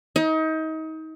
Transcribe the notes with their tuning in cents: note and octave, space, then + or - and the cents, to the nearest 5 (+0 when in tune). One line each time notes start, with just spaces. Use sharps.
D#4 +30